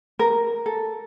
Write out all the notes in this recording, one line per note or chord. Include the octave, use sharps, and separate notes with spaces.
A#4
A4